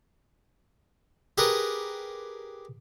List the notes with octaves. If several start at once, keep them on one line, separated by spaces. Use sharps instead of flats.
G4 G#4 A#4 B4